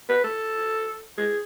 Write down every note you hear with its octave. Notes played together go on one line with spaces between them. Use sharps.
B4
A4
G#4